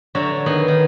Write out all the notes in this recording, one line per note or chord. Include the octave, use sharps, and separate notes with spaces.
D3 F#3 C#5 E5 A#5
D#3 B3 G#4
D#3